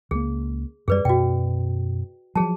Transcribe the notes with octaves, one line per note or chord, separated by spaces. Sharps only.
C#2 A#3 G#4
F#2 G3 G#4 B4 D5
F#2 B2 F#4 G5
F3 F#3 G#4 A5